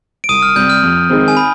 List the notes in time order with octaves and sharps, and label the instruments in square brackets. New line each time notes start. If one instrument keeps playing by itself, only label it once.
[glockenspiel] D7
[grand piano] C2 [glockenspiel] D#6 D#7
[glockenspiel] F6
[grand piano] C3 G3 [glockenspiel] G6
[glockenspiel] F6
[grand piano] F2
D#3 G#3 C4
[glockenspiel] G#5
B5